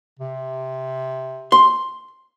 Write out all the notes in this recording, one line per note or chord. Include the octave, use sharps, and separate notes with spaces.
C3
C6